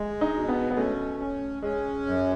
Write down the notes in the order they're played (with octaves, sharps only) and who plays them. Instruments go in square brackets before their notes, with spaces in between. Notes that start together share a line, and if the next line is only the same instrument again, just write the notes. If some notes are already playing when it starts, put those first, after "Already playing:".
Already playing: [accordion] G#3
[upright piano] D#4
[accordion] B2
[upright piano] B3
B3
[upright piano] A3 [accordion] C#4
[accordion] C#4
[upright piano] G#3 [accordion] C#4
[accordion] F#2